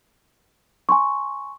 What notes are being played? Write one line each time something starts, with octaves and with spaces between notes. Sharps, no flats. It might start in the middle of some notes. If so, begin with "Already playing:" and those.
G#5 C6 C#6